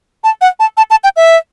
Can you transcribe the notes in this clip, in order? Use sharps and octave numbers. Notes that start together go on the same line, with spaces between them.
A5
F#5
A5
A5
A5
G5
E5